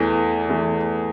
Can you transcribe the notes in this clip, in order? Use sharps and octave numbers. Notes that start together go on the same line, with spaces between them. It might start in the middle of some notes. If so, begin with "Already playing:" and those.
Already playing: E2 E3 A3
E3 A3